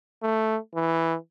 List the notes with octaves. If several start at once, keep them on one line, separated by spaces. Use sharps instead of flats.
A3
E3